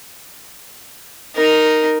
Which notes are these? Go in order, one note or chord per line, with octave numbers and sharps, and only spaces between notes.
D#4 A#4